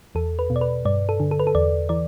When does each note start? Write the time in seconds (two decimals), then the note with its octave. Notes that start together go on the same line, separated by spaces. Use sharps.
0.15 E2 A4
0.39 B4
0.50 B2
0.56 D5
0.61 B4
0.85 G2 D5
1.09 A4
1.20 D3
1.31 A4
1.39 B4
1.47 A4
1.55 E2 D5
1.89 E3 D5